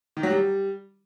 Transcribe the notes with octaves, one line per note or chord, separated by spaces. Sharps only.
D#3
F#3
G3